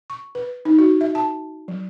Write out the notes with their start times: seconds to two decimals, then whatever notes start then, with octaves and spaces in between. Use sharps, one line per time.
0.10 C#6
0.35 B4
0.65 D#4
0.79 F#4
1.01 E5
1.15 A5
1.68 F#3